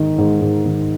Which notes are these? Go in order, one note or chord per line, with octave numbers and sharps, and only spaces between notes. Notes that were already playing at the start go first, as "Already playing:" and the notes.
Already playing: G#2 D#3
G#2
G#2
D#3